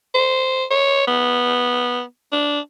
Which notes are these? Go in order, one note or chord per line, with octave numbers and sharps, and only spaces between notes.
C5
C#5
B3
D4